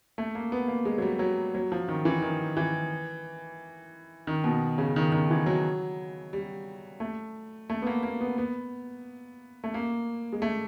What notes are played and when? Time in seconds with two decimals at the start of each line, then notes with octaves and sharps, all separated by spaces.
0.18 A3
0.35 A#3
0.52 B3
0.68 A#3
0.85 G#3
0.98 F#3
1.02 G3
1.19 F#3
1.55 F#3
1.72 F3
1.89 D#3
2.05 E3
2.22 D#3
2.57 E3
4.27 D#3
4.44 B2
4.78 C#3
4.96 D#3
5.12 D#3
5.30 E3
5.46 F#3
6.33 G3
7.00 A3
7.70 A3
7.82 B3
7.87 A#3
8.03 A#3
8.21 B3
8.38 B3
9.64 A3
9.74 A#3
10.33 G#3
10.42 A3